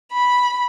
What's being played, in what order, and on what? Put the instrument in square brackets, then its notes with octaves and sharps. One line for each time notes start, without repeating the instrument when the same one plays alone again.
[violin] B5